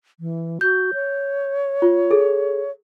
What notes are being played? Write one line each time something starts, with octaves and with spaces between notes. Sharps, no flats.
E3
F#4 G6
C#5
F4
G#4 A4